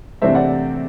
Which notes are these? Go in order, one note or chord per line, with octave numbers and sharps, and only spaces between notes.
C3 E3 A3 D4 C5 E5
D5 F#5